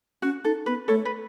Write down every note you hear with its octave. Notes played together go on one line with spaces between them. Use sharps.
C#4 F#4
D#4 A4
B3 B4
A3 A4 C#5
B4